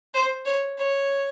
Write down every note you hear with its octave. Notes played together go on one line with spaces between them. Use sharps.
C5
C#5
C#5